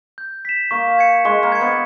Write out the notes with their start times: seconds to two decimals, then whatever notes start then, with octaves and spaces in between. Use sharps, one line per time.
0.18 G6
0.45 B6 E7
0.71 A#3 C#6
0.99 G#6 C#7
1.25 G#3 C#6
1.43 A#3
1.52 G#6 C#7
1.61 B3